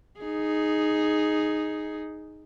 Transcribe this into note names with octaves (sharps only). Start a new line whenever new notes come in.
D#4 G#4